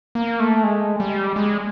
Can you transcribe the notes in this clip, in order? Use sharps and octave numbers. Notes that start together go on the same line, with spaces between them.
A#3
A3
G#3
G3
G#3